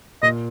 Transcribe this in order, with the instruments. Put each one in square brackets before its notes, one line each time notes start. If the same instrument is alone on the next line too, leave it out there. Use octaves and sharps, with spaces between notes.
[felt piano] A#2 [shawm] D#5